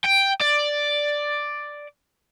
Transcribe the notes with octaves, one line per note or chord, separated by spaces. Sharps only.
G5
D5